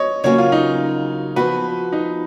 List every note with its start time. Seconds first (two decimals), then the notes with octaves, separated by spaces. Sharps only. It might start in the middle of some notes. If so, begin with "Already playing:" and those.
Already playing: C#5 D#5
0.24 C#3 F#3 A#3 C#4 F#4 C#5
0.38 F4
0.52 D#4
1.36 F3 B3 F#4 B4
1.92 D#4